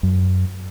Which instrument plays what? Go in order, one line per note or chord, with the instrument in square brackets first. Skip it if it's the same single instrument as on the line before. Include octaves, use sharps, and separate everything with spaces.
[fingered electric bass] F#2